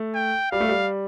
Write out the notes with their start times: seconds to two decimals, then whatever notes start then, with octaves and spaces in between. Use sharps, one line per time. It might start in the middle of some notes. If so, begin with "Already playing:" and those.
Already playing: A3
0.15 G5
0.51 G3 F5
0.60 A3
0.69 G3